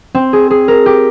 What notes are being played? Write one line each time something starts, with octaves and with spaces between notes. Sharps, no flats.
C4
G#4
G#4
A#4
G4